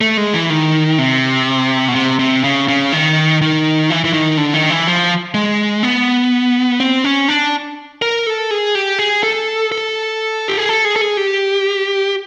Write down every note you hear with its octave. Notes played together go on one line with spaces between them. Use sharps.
A3
G#3
E3
D#3
C3
B2
C3
C3
C#3
C#3
D#3
D#3
E3
E3
D#3
D3
D#3
E3
F3
G#3
B3
C4
C#4
D4
A#4
A4
G#4
G4
G#4
A4
A4
G4
G#4
A4
G#4
A4
G#4
G4